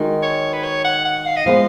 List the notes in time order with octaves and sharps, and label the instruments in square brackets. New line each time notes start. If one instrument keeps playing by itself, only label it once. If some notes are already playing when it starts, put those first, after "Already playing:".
Already playing: [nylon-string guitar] D#3 G#3 D#4 F#4
[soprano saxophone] C#5
B4
C#5
F#5
F#5
F5
D#5
[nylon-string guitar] F3 G#3 B3 [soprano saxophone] F5